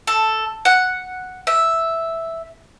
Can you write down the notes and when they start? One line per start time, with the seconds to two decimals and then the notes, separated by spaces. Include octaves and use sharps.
0.07 A4
0.65 F#5
1.47 E5